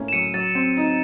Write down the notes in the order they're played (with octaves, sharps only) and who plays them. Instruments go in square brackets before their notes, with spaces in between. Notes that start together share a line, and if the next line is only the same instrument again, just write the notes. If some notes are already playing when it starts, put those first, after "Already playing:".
Already playing: [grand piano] A2 A#3 C#4
[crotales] E7
[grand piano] F#3 [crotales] C#7 D#7
[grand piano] F#3 [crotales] A6
[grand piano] C4
D#4